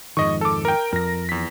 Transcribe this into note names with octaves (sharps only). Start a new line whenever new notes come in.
F2 G#2 D#3 D#5 C#6
A4 D6
A#4 G5
F2 A#4 A#6
E2 B6